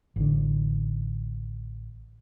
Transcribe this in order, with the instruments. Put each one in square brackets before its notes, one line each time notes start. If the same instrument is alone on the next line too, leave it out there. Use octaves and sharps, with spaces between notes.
[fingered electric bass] A1 D3